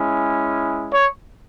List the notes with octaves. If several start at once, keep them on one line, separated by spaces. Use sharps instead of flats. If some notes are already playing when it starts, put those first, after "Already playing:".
Already playing: G#3 C#4 E4
C#5